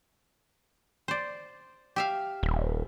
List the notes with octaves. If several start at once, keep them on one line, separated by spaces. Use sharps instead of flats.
C5 D5
G4 E5 F5
D#1